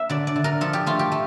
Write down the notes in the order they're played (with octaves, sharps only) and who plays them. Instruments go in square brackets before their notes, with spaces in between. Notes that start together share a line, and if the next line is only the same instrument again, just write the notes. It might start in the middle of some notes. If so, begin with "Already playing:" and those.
Already playing: [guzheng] A#3 E5
D3 D5
D5
D3
A#4
F3 A4
G4
A3 F4
G4
A3